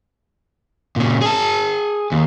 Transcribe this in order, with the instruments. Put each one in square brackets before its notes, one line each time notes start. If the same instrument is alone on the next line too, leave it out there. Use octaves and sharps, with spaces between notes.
[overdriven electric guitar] A#2 C#3
G#4 A5
D#2